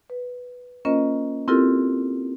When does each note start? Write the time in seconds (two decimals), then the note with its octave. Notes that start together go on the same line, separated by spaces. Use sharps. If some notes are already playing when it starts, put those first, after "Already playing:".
0.10 B4
0.85 A#3 C#4 F4 A#4 C5 D#5
1.48 C4 E4 F4 G4 A4 A#4